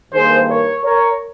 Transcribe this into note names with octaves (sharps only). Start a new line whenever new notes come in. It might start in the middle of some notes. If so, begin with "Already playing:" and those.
G2 D#3 A#3 G#4 C5
A#4 C#5
A#4 C#5